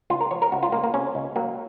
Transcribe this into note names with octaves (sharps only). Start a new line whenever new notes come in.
C#2 F4
A#4
F3 C#5
A#4
C#2 F#4
F4
C#2 A#3
A#3
C3 C#4
C#2
F#3 A#3